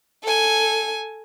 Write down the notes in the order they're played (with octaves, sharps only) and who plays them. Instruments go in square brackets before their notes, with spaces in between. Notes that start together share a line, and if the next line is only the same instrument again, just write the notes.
[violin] A4 G#5